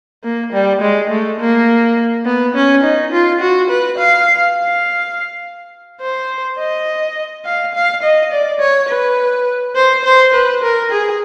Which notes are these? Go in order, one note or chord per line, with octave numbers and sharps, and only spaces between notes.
A#3
G3
G#3
A3
A#3
B3
C#4
D#4
F4
F#4
B4
F5
F5
C5
D#5
F5
F5
D#5
D5
C#5
B4
C5
C5
B4
A#4
G#4